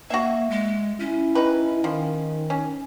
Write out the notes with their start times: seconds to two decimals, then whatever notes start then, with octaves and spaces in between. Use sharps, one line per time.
0.10 A#3 F#4 E5
0.50 G#3
1.00 C#4 E4
1.35 D#4 B4
1.84 D#3 F3
2.50 C#4